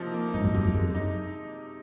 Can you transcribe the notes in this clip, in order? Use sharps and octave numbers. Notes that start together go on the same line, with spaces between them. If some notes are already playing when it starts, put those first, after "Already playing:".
Already playing: C3 F3 A#3 D#4
A#3
G#2 D#4
F#2
F#2 C3
F2
F#2 G#3
D#4